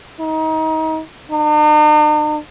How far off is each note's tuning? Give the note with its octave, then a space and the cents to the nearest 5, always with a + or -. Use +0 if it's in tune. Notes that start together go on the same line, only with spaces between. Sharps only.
D#4 +30
D#4 -45